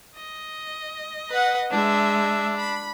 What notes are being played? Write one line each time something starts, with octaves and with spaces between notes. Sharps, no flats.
D#5
B4 F#5
G#3 D4 E5
B5